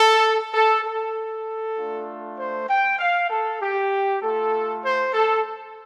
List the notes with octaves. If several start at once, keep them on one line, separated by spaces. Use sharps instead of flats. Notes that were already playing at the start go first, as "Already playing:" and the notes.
Already playing: A4
A4
A4
A3 D4 F4
C5
G5
F5
A4
G4
A3 F4 A4
C5
A4